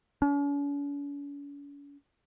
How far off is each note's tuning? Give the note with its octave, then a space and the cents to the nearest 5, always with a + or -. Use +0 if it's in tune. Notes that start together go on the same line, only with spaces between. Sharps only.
C#4 +45